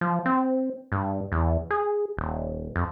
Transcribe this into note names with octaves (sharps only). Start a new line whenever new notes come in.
F3
C4
G2
E2
G#4
D#1
F2